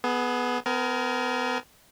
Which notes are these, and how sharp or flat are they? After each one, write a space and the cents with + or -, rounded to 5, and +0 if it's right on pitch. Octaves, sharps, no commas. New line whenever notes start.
B3 +0 G#4 +30
B3 +35 A#4 +0 G#5 +25